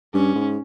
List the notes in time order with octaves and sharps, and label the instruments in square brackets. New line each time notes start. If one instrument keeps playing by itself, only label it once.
[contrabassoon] G2 [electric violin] C#4
[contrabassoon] G#2